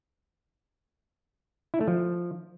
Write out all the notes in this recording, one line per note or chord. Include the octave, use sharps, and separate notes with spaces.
E4
A3
F3